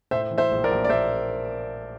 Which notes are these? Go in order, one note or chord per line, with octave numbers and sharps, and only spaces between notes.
A2 C5 E5
E3
C5 E5
A#1
A#4 D5
A#1
D5
A#1 C5 E5